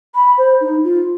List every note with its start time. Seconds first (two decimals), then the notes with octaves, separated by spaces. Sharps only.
0.15 B5
0.38 C5
0.61 D#4
0.84 F4